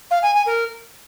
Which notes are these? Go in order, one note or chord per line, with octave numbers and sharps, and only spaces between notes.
F5
G#5
G#5
A#4